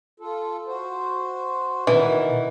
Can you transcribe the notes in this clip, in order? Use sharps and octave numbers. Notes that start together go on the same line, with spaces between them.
F4 A4
F#4 C5
B2 D#3 E3